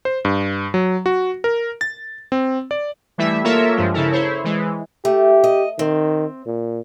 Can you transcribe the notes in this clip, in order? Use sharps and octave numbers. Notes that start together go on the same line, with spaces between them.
C5
G2
F#3
F#4
A#4
A6
C4
D5
E3 G3 A3 E4 E5
A#3 F4 A4 A#4 C#5 E5
G2 F3 G#3
C#3 E4 A4 A#4
E4 C5 C#5
E3 G#3
A3 G4
D#5
D#3 C4
A#2